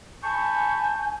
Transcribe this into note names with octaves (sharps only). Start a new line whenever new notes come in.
G#5 A5 B5 C#6 G6